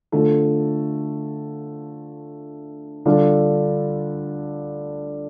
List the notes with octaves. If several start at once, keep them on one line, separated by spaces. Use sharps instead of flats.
D3 F3 A3
D3 G3 D4 F4 A4